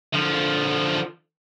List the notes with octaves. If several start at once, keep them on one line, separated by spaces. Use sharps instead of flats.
D3 F3